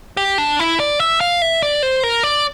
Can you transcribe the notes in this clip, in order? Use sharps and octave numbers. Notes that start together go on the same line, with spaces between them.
G4
D4
E4
D5
E5
F5
E5
D5
C5
A#4
D5